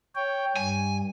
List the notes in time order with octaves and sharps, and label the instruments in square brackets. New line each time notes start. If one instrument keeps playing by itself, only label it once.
[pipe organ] C#5 G5
[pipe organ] G2 [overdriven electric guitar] G#5